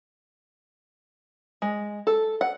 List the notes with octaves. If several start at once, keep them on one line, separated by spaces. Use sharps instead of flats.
G#3
A4
F#5